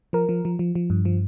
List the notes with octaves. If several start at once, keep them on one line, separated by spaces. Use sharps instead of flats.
F3 A#4
F3
F3
F3
F3
G2
F3